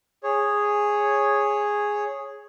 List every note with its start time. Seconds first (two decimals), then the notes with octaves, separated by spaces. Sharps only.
0.23 G#4 C#5